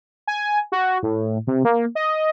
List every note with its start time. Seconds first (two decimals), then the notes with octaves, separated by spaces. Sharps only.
0.27 G#5
0.72 F#4
1.03 A2
1.47 C3
1.65 A#3
1.95 D#5